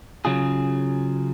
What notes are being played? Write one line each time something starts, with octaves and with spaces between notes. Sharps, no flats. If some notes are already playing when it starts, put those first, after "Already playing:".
C#3 F#3 C#4 F4 G#4